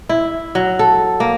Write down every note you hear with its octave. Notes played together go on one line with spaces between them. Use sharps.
E4
F#3
A4
A#3